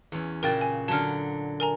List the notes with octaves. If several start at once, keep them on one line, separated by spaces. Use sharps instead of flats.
E2 C#4
A#2 C#3 F#4 A#4 G5 A6
G#5
D3 F#3 A5 F6
A#4 G#5 A#5